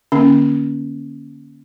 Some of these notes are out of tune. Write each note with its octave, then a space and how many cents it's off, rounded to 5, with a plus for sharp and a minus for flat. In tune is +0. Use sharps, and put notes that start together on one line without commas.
D3 +0 A#3 +20 C#4 +0